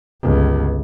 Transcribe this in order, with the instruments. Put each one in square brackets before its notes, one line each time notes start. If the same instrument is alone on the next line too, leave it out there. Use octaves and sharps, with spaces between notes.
[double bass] G1 C#2